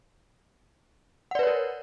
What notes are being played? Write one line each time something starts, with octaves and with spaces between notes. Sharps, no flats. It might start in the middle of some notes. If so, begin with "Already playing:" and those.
A#4 B4 C#5 D5 F#5